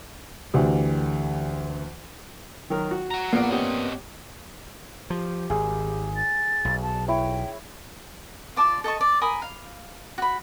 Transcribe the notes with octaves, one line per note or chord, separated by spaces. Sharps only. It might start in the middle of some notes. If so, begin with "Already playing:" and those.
D2 D3 E3 G4
D#3 F#3 A#4
F#4
F#5 A#5
A#1 A#3 B3 D5
C4 C#4 G4 D#5 F#5
F3 G4
G#1 G#4
A6
B1
A5
E4 C#5 G5
F4 D5 A5 D6
A4 D#5 A5 C#6
D5
A#4 G#5 B5 D#6
F5
F#4 B5